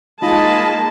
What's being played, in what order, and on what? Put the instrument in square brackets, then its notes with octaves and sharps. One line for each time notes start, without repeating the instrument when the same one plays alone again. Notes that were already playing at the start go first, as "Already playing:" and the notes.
[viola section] G#3 A#3 A5 [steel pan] D#4 F4 [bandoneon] D#5 B5